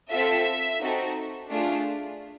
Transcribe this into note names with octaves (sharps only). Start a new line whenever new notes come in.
C4 F4 A4 E5
C4 D#4 F#4 A4
A3 D4 F4 G#4